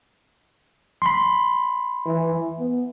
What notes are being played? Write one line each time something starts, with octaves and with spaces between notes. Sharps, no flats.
B5 C6
E3
B3